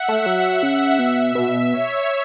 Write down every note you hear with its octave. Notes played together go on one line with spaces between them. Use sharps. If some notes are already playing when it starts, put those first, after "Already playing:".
Already playing: E5 F#5
A3
F#3
C#3
B2
B2
C#5